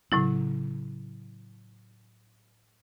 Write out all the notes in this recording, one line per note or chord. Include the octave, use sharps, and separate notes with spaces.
A2 C#3 F#3 C4 E4